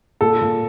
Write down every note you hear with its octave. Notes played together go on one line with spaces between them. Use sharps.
A#2 A4
A#2